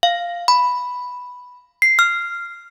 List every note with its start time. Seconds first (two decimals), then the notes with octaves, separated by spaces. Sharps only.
0.03 F5
0.48 B5
1.82 C7
1.99 F6